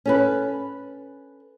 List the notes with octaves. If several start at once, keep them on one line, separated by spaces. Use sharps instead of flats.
C#4 A4 B4